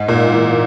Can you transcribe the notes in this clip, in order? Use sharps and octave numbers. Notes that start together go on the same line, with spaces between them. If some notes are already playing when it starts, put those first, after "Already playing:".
Already playing: G#2
A#2
E3